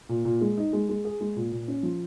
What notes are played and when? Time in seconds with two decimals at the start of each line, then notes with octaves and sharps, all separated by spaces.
0.09 A#2
0.25 A#2
0.41 G#3
0.58 D#4
0.73 G#3
0.89 G#3
1.05 G#4
1.21 G#3
1.36 A#2
1.52 A#2
1.68 C#4
1.83 F3